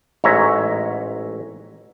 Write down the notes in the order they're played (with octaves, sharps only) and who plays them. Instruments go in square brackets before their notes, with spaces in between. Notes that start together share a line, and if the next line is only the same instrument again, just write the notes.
[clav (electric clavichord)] A1 G#2 C#5 E5 A#5